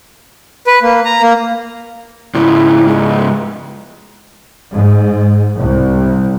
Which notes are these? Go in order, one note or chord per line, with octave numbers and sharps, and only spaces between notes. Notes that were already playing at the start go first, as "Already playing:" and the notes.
B4
A#3
A#5
A#3
C#2 G#2 E4
G#3
G#2
C2